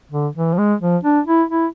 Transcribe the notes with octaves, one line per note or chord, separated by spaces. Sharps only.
D3
E3
F3
G#3
F3
D4
E4
E4